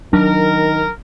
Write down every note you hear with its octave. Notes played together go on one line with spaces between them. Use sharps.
D#3 F#3 D4 A#4